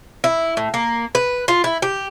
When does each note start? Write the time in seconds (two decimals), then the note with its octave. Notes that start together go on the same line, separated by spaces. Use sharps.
0.24 E4
0.57 A2
0.74 A#3
1.15 B4
1.48 F4
1.64 E4
1.82 G4